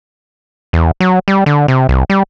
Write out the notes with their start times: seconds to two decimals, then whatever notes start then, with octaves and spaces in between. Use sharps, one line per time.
0.73 E2
1.00 F#3
1.28 G3
1.46 D3
1.68 C3
1.89 C2
2.10 G3